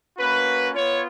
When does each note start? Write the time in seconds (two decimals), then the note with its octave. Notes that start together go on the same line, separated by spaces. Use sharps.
0.18 A#3 C#4 F#4 B4
0.74 B3 F4 C#5